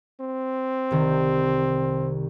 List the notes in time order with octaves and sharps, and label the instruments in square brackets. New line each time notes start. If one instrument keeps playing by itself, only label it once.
[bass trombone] C4
[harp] C2 D#3